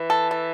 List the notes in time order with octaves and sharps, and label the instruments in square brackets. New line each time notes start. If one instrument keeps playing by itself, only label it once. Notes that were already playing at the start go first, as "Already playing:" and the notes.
Already playing: [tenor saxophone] E3
[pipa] A4
A4